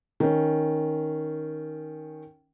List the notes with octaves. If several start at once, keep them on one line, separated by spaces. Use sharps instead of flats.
D#3 C#4